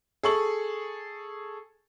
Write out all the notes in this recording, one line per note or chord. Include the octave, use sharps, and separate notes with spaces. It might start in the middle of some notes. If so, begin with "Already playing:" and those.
G#4 A4 C#6 F#7